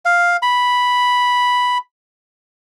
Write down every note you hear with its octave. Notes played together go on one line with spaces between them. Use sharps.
F5
B5